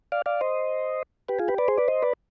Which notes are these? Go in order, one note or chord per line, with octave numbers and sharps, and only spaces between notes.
D5 F5
D5 F5
C5 D#5
G4 B4
F4 G#4
G4 B4
B4 D5
G#4 C5
B4 D5
C5 D#5
B4 D5